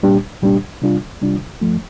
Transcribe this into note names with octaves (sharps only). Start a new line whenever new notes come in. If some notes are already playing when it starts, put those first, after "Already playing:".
C2 A#2 G3 D4 G4
C2 A#2 G3 D4 G4
C3 G3 D4 F4
C3 G3 D4 F4
G2 F3 A3